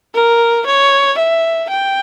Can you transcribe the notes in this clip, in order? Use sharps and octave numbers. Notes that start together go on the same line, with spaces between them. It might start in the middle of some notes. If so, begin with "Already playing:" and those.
A#4
C#5
E5
G5